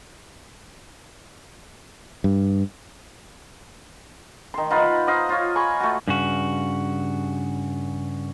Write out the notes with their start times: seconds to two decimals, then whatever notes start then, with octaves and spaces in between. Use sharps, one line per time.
2.24 G2
4.54 D#3 C6
4.70 D#4 F4 B4 F#5
5.07 C5 D#5 F5 F#5
5.29 F4 C#5
5.56 G#5 B5 C#6
5.80 A3 F#4
6.08 G2 C#3 F#4